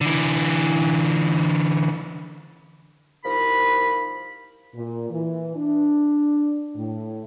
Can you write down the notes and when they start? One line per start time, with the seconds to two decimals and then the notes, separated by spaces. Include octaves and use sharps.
0.01 D3 E3
3.25 C2 F3 D#4 A#4 B5
4.75 A#2
5.10 E3
5.56 D4
6.75 A2